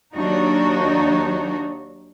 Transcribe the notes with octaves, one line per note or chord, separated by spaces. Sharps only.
D#2 F#3 D4 D#4 F#4